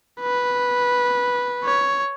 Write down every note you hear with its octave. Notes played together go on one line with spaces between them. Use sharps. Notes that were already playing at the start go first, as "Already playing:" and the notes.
B4
C#5